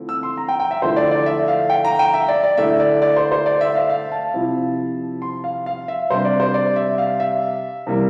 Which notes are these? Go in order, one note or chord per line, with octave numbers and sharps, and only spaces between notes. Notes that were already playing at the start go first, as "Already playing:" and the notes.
Already playing: D3 F3 A3 C4 E4
E6
C6
A#5
G5
G5
E5
D3 F3 A3 E4 C5
D5
D5
E5
F5
G5
A#5
G5
E5
D5
D5
D3 A3 E4 E5
D5
D5
C5
C5
D5
E5
F5
F5
A5
C3 F3 C4 E4
C6
F5
F5
E5
C3 G3 D4 C5
D5
C5
D5
E5
F5
E5
C3 E3 G3 A#3